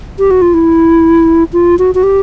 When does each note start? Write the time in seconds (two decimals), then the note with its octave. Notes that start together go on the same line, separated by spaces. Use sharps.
0.19 G4
0.31 F#4
0.42 F4
0.54 E4
1.53 F4
1.79 F#4
1.95 F#4
2.03 G4